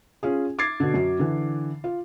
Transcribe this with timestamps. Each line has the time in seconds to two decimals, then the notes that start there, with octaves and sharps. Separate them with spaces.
0.23 C#4 F4 G#4
0.59 D6 G#6 A6 C7
0.80 B2 D3
0.94 F#2 F#4
1.19 D3 E3
1.84 F4